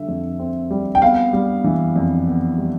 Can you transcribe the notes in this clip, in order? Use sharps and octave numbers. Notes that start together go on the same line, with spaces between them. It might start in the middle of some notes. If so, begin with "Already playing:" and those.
Already playing: D3 G3 E5
F2
C4
G3
G5
B3 F5
G3
E3
F2
B3
G3